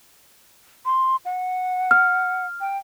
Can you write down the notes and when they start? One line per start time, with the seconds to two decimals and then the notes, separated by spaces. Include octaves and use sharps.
0.85 C6
1.25 F#5
1.91 F6
2.61 G5